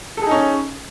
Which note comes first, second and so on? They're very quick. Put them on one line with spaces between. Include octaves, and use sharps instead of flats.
A4 G#4 D#4 C#4